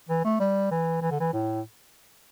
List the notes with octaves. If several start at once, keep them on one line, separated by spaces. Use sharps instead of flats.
E3
A3
G3
E3
E3
D3
E3
A2